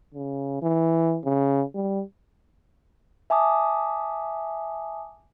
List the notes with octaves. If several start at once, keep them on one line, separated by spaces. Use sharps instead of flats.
C#3
E3
C#3
G3
E5 G#5 A5 D6 D#6